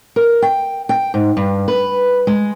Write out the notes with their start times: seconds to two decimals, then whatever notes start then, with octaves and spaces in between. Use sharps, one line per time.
0.16 A#4
0.42 G5
0.89 G5
1.14 G#2
1.37 G2
1.68 B4
2.27 G#3